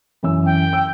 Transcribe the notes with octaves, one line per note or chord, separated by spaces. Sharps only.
F#2 E3 E6
G5
E6